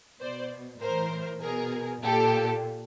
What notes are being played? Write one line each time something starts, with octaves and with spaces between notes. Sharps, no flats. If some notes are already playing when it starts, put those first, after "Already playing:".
B2 C5 D5
A2 E3 A#4 C5
B2 G#4 A#4
A#2 G4 A4